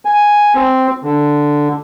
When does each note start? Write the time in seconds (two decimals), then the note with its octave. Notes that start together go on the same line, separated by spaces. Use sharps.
0.05 G#5
0.55 C4
1.03 D3